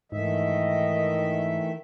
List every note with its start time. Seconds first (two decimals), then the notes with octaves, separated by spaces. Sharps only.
0.12 G#2 D#3 E3 A3 D#5 E5